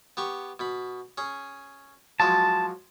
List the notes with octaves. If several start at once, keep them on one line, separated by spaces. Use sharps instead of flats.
B3 G4 C#6
B2 B5
C#4 G#4
F3 F#3 G#3 A5